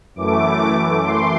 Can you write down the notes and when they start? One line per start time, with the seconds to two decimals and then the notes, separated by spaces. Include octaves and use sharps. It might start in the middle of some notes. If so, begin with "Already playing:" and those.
0.15 F#2 E3 A3 D6
1.02 C6